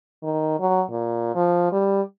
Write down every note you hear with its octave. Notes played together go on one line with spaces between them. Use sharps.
D#3
F#3
A#2
F3
G3